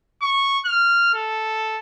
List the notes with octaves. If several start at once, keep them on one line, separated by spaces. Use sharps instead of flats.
C#6
F6
A4